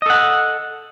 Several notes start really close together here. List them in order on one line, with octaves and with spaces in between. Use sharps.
D#5 A4 F#5